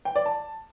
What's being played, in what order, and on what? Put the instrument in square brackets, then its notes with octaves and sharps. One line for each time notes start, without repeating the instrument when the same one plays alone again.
[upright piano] G5
D5
A5